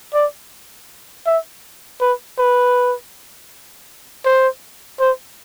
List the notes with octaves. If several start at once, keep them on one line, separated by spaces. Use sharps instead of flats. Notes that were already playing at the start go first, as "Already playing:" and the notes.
D5
E5
B4
B4
C5
C5